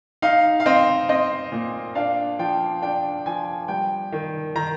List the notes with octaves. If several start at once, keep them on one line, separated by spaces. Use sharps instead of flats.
D#4 F5
F5
C4 D#5
C4 D#5
A#2
D4 F5
F3 G5
D4 G5
F3 G#5
G3 G5
D#3
D#3 A#5